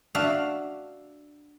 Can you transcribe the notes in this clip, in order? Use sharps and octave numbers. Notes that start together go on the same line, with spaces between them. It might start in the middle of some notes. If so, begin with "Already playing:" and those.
D4 F#4 E5 F5